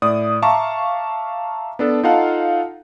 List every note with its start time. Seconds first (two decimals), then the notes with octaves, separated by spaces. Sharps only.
0.02 A2 D5 D#6
0.42 E5 F5 A5 A#5 C#6 D6
1.79 B3 D4 A4
2.03 D#4 F4 A4 F5 F#5 A5